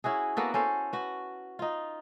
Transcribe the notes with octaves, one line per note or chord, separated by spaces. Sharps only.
C#4 E4 F#4 G#4
A#3 B3 F#4 A4
C#4 A4 C5
F#4 B4
D#4 F4